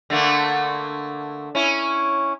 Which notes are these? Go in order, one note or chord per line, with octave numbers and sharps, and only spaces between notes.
D3 A3 A#3
C#4 E4